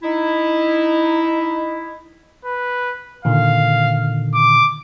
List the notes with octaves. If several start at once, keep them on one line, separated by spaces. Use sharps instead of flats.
D#4 E4
B4
A#2 D3 D#3 F5
D6